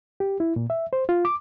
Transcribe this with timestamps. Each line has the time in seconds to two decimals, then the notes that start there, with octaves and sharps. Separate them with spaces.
0.20 G4
0.40 E4
0.56 A#2
0.70 E5
0.93 C5
1.09 F4
1.25 D6